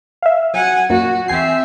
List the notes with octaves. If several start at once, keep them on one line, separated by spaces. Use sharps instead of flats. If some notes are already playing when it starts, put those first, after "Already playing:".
E5 F5
F#3 F#5 G#5
F#2 A#2 A#3 F#4
E2 C4 E5 G#5 C7